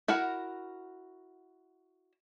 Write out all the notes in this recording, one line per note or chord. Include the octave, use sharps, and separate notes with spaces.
E4 F#4 A#4 F#5